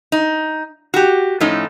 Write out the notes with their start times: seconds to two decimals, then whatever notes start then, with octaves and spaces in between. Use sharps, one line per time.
0.12 D#4
0.94 F#4 G4
1.40 A2 F3 A3 C#4 D#4